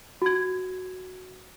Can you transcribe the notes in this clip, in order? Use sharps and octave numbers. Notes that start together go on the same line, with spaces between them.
F#4 G#6